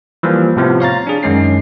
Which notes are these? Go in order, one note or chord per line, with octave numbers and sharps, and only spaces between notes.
E3 F3 G3 A#3
A2 C3 F3 B3
C#5 F5 A#5 A6
D4 G#4
F#2 D#3 G#3 C#4 C7